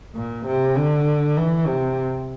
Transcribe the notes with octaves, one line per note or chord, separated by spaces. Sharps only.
A#2
C3
D3
E3
C3